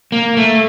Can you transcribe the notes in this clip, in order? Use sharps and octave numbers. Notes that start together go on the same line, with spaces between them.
A#3
A3